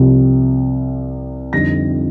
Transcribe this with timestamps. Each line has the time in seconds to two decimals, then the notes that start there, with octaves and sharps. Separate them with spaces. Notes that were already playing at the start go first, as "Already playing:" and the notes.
Already playing: C2 C3 F3
1.53 F2 D3 G3 C4 D#4 A#6